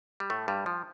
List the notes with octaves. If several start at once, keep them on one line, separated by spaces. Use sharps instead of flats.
G3
A2 A3
G2 G3
F3